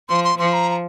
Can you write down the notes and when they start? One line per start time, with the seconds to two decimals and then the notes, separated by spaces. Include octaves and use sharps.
0.09 F3 C6
0.24 C6
0.39 F3 C6
0.53 A#5
0.69 A#5